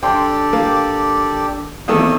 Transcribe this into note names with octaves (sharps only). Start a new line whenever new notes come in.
G#1 D3 G4 A4 D5 G5 C6
A#3
E2 D#3 A#3 C4 F#4 A4 D#6 E6